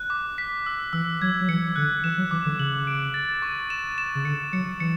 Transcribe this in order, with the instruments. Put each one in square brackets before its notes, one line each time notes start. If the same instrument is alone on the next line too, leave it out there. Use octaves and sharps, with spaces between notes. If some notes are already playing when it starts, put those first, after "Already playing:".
Already playing: [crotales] F#6
D6
B6
E6
[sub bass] E3 [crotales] E6
[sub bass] F#3 [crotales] G#6
[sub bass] F#3
[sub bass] E3 [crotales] C#7
[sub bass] D3 [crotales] F#6
[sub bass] E3 [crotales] E7
[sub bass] F#3
[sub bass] E3 [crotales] D6
[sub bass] D3
[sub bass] C#3 [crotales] F#7
[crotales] D7
A6
C#6
E7
E7
[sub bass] C#3
[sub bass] D3 [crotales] C#7
[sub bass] F#3 [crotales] C#7
[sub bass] E3 [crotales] C#7